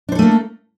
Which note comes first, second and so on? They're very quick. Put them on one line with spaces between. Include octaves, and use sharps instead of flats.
D4 C5 A4 A3 A#3